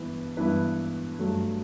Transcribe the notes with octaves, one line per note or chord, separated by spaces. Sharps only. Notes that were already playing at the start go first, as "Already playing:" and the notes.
Already playing: G2 E3 B3 E4
G2 E3 B3 E4 B4
G2 F#3 A3